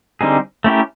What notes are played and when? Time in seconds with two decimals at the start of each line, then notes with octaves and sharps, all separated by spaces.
0.21 D3 G3 C4 D#4 G#4
0.64 A3 C#4 E4 G4 A#4